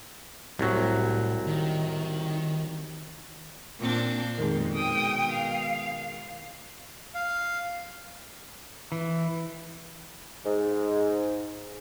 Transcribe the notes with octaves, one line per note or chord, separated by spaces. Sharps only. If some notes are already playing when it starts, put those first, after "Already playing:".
C2 A2 F#3
D#3
A#2 C4 D4
F2 B2 D#3 G#3
G5 D#6
F5
F5
E3
G#2